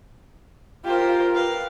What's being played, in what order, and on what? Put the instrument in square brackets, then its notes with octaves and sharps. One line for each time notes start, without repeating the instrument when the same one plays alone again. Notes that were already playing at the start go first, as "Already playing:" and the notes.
[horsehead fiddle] F4 A#4 [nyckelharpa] G4 C5
[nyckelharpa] B4 F5